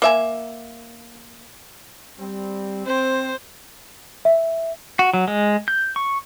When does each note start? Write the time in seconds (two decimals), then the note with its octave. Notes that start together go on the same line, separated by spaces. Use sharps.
0.02 A#3 E5 G#5
2.19 G3 C4
2.87 C4 C5
4.25 E5
4.99 F#4
5.14 F#3
5.28 G#3
5.68 G6
5.96 C#6